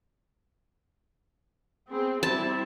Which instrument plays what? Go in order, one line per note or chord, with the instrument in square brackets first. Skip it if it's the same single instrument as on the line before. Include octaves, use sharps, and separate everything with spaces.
[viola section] B3 C4 G#4
[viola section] G3 C4 E4 [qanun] A5